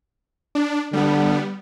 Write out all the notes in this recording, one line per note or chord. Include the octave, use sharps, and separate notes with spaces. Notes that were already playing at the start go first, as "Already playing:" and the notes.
D4
D3 G3 B3